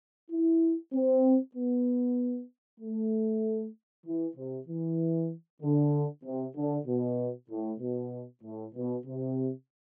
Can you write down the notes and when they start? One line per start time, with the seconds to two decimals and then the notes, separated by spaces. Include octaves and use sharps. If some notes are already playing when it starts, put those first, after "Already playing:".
0.31 E4
0.94 C4
1.56 B3
2.80 A3
4.06 E3
4.37 C3
4.68 E3
5.62 D3
6.24 C3
6.56 D3
6.87 B2
7.50 A2
7.81 B2
8.44 A2
8.75 B2
9.06 C3